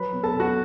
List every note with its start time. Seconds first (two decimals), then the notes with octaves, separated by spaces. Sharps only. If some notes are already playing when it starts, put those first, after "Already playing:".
Already playing: F#3 B4 B5
0.13 B2
0.23 A4 A5
0.34 B2
0.40 F#4 F#5